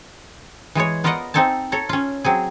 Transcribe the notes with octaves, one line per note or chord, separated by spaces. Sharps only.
E3 G#3 G#4 C#5
B3 F4 A#4 D5 D#5 F#5
C4 D#4 A4 G#5 A5
A4 C#5 A#5
C#4 F4
F#3 C4 G#4